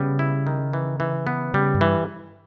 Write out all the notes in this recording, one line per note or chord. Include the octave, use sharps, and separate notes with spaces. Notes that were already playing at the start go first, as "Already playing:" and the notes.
Already playing: C#3 G3 B3
E4
D#3
E3
E3
B3
C#3 G3
G2
E3